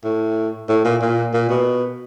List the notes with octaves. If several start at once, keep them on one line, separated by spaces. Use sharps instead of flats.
A2
A2
A#2
A#2
A#2
B2